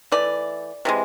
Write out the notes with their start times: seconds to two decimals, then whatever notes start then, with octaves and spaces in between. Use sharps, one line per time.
0.12 E3 A3 D5
0.85 C3 E3 G#3